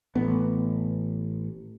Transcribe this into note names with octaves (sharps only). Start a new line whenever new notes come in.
A1 B3